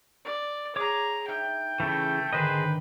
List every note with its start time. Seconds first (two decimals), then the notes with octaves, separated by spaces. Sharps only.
0.25 D5
0.76 G#4 C#5 A#5 D6
1.28 D#4 E5 G5
1.80 C#3 E3 A3
2.33 G#1 D3 D#3 G#4 B4 C5 D#5